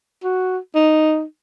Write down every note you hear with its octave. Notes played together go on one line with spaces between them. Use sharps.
F#4
D#4